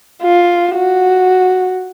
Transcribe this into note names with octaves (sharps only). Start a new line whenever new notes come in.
F4
F#4